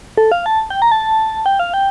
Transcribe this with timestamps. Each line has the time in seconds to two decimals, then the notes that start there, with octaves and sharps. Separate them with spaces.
0.17 A4
0.32 F5
0.46 A5
0.70 G5
0.82 A#5
0.92 A5
1.46 G5
1.60 F5
1.74 G5